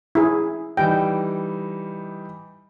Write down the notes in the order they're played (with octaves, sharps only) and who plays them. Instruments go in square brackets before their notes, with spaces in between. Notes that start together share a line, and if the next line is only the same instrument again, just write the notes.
[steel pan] E4 G#4
[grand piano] E3 G3 D#4 [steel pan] G5